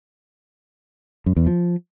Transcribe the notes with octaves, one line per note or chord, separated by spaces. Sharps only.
F#2
E2
F3